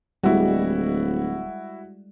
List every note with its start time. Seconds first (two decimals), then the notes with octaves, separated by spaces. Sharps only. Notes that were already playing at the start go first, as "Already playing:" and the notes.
0.24 D1 G3 G#3 E4 F#4